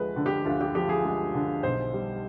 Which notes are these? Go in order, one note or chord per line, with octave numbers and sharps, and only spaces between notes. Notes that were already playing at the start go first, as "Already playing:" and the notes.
Already playing: D2 F3 G#3 B4
D3
G4
D2 F4
G4
F3 G4
G#4
G#3
D3
B1 C5
G3